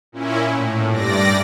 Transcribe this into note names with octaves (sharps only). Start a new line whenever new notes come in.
A#2 C#4 E4
A2
G2 D5 A#6